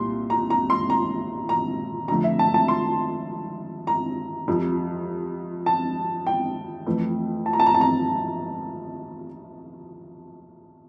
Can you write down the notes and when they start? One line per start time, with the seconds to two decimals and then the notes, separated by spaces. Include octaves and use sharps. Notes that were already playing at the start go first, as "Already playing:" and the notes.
Already playing: C2 A#2 G3 C6
0.30 A#5
0.50 A#5
0.70 C6
0.90 A#5
1.49 A#5
2.08 F2 D3 F3 A3 A#5
2.24 E5
2.39 A5
2.54 A5
2.68 C6
3.87 A#5
4.48 F2 C3 F3
5.66 A5
6.27 G5
6.86 F2 E3 A3
7.46 A5
7.53 A#5
7.60 A5
7.66 A#5
7.74 A5
7.81 A#5